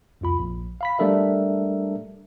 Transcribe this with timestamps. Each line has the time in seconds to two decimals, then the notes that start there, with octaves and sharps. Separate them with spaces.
0.21 C2 F2 F4 B5
0.39 A#1
0.81 F5 B5 B6
0.99 G3 A3 D4 A4 A#4 E5